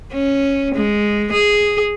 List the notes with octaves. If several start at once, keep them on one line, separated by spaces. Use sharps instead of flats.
C#4
G#3
G#4